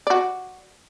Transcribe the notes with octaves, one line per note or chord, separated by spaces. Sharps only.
F#4 D5